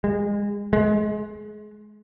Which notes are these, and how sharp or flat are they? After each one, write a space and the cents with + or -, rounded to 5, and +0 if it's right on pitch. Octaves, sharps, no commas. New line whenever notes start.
G#3 -30
G#3 +25